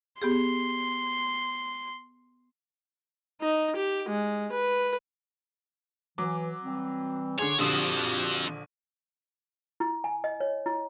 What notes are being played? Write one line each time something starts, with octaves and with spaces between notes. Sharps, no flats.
B3 G4 G#4 C6
D#4
G4
G#3
B4
E3 F#3 D6
E3 G3 C4
D3 G#4 C#5 C6 D6
A#1 D3 F3 C4 F#4 G4 D#6
E4
G#5
D#5
C#5
E4